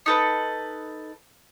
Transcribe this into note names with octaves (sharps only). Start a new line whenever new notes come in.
D#4 A4 B4